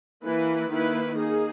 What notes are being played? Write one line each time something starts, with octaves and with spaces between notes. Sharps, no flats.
E3 A#3 E4 B4
D#3 A#3 E4 B4
A#3 D#4 G#4